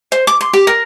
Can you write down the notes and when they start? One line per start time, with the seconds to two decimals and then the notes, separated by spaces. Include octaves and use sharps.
0.12 C5
0.27 D6
0.41 C6
0.53 G4
0.67 A#4